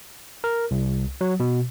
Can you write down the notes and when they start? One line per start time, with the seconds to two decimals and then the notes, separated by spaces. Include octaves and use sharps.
0.44 A#4
0.71 C2
1.21 F#3
1.40 B2